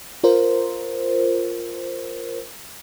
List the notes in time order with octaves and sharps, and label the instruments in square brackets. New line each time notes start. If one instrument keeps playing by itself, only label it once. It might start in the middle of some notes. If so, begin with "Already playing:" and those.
[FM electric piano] F4 A#4 C5